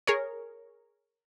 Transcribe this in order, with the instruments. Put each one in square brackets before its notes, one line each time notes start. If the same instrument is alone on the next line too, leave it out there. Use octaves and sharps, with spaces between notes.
[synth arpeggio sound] G#4 A#4 C#5